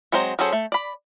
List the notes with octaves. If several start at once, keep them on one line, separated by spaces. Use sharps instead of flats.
F#3 G#3 C4 C5 A#5
F#3 C#4 G#4 A4 C5
A3
D5 B5